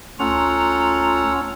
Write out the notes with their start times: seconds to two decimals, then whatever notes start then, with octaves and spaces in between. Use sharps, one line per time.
0.20 D2 C#4 F4 A4 F#5 A#5